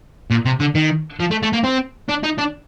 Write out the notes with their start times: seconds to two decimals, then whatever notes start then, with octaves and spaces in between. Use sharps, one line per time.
0.31 A#2
0.45 C3
0.60 D3
0.75 D#3
1.20 F3
1.31 A3
1.43 A3
1.53 A#3
1.64 C4
2.09 D4
2.24 D#4
2.39 D4